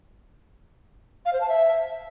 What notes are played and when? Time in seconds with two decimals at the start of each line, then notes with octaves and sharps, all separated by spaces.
1.25 F5
1.33 C5
1.40 A5
1.48 E5